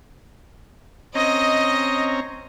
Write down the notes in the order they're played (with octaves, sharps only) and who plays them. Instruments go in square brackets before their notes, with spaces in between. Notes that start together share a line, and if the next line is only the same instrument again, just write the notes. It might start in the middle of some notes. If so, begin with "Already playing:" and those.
[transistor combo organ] C4 C#4 A#5 [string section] D#5